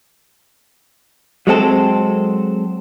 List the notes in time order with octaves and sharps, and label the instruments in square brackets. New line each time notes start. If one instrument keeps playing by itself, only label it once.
[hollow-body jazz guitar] F#3 G#3 C4 A4